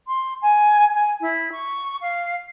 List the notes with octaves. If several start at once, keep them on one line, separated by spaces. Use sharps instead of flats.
C6
G#5
G#5
E4
C#6
F5